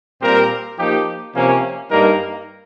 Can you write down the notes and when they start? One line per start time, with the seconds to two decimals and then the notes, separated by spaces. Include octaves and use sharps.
0.21 A#2 G3 C4 G4 A#4
0.78 F3 A#3 D#4 G4
1.34 C3 F3 A#3 C#4
1.90 G2 G3 A#3 D#4 A#4